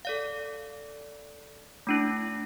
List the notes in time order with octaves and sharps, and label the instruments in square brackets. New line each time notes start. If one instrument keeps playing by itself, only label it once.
[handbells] A4 D5 F5
A3 D4 E4